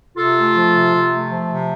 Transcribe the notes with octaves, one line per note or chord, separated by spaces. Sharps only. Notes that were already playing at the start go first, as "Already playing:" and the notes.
C3 F4 A4
A3
F3
C3
C3
A3
F3
C3